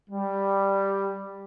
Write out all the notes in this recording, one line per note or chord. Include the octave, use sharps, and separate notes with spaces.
G3